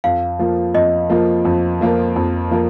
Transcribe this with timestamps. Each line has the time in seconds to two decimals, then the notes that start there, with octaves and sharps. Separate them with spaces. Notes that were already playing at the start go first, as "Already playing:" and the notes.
0.04 F2 F5
0.39 F3 A#3 F4 A#4
0.74 F2 D#5
1.09 F3 A#3 F4 A#4
1.45 F2
1.81 F3 A#3 F4 A#4
2.16 F2
2.51 F3 A#3 F4 A#4